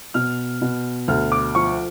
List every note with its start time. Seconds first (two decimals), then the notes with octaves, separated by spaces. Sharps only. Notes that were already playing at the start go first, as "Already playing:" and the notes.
0.14 B2 F6
0.62 B2
1.08 D2 F6
1.32 D6
1.55 F3 C#6